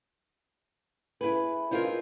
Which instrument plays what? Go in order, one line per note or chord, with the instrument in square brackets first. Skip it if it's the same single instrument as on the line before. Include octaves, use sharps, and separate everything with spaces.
[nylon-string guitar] E4 G#4 B4
C4 D#4 F4 G4 G#4 A#4